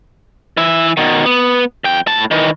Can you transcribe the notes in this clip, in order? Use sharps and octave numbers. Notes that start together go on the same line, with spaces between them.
E3 E5
B2 D#3
B3
F2 G5
A2 A5
D#3 E3